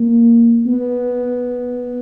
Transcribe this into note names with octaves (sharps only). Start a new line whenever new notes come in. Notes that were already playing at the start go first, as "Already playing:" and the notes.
Already playing: A#3
B3